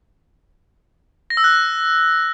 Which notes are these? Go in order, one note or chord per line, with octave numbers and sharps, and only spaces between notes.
A#6
E6
F#6